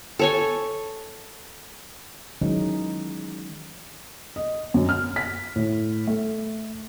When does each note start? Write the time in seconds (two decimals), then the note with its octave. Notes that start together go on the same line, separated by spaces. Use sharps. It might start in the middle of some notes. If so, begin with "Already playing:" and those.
0.19 A4 C#5 G#5
2.41 D#3 E3 F#3 G#3 C#4 D#4
4.36 D#5
4.74 F#2
4.89 F6
5.16 B6
5.56 A2
6.07 A3